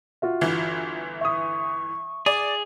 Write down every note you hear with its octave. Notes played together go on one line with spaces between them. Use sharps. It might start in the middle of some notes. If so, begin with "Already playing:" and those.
F4 F#4 E5
G1 E3
E5 C#6 D#6
G#4 D5